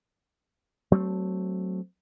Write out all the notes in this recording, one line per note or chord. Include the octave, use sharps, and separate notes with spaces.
F#3 A3 B3 C4